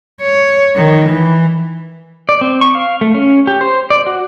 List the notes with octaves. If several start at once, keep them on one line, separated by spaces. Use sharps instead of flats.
C#5
D#3
E3
D5
C4
C#6
F5
A3
C#4
G4
C5
D5
F#4